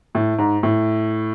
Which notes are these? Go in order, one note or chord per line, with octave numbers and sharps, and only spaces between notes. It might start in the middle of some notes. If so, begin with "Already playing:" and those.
A2
G#2
A2